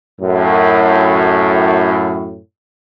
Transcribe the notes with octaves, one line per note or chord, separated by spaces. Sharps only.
F#2 A2